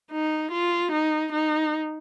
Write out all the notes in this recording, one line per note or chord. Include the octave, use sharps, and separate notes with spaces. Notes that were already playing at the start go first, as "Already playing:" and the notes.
D#4
F4
D#4
D#4